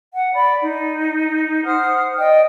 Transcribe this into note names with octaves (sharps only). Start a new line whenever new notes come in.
F#5
D5 B5
D#4
C5 F#5 D#6 F6
D5 D#5 G5